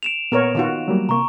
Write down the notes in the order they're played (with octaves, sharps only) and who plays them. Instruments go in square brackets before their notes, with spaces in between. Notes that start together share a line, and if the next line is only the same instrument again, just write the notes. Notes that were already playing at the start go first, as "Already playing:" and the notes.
[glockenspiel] D7 E7 F7
[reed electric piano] A#2 [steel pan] B3 A#4 C#5
[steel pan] D#3 F4 F#4
[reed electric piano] F#3 G3 A#3
[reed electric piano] C3 A#3 [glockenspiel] A#5 C#6